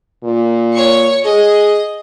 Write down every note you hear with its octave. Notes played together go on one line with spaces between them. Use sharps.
A#2
C#5 C#6
G#4 D#5